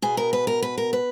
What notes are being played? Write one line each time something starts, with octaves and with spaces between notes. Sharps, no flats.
B2 G#4
A#4
B4
A#4
B4
A#4
B4